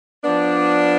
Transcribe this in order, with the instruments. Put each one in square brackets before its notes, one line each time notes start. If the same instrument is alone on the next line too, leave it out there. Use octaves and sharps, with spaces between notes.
[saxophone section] F3 B3 D4